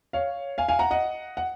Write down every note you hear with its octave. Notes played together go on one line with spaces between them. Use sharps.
C#5 F5
F5 G#5
F5 G#5
F#5 A#5
D#5 F#5
F#5